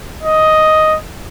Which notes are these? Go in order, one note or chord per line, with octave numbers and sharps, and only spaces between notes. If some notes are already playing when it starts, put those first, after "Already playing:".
D#5